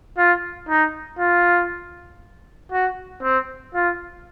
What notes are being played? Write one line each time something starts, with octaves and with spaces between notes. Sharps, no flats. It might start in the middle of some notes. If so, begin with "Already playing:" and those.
F4
D#4
F4
F#4
C4
F4